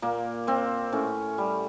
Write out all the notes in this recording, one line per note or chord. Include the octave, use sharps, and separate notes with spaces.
A#2 A#3
A#2 C4
A2 C#4
G3